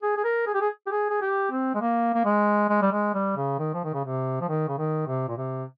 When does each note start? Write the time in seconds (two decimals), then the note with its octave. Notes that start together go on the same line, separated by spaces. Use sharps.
0.03 G#4
0.16 G#4
0.24 A#4
0.46 G#4
0.54 G4
0.61 G#4
0.87 G4
0.91 G#4
1.10 G#4
1.21 G4
1.51 C4
1.74 G#3
1.81 A#3
2.14 A#3
2.25 G#3
2.69 G#3
2.82 G3
2.92 G#3
3.14 G3
3.36 C#3
3.59 D#3
3.74 F3
3.84 D#3
3.94 C#3
4.04 C3
4.41 F3
4.49 D#3
4.68 C#3
4.78 D#3
5.07 C3
5.28 A#2
5.37 C3